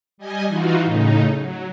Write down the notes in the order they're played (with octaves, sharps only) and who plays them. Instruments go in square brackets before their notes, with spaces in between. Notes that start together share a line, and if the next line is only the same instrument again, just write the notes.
[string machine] G3 D#5 G#5
E3 D#4 F4 F#4
A2 C#3 D#4
F#3